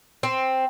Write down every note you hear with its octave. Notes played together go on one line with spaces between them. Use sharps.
C4